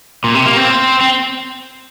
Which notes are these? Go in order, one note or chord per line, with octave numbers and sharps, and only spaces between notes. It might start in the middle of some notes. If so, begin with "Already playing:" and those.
A#2
C3
A#3
C4
C4